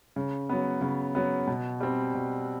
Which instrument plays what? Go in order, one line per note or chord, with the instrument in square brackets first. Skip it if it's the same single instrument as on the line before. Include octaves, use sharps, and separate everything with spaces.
[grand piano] C#3
F#3 B3
C#3
F#3 B3
B2
G3 C4
B2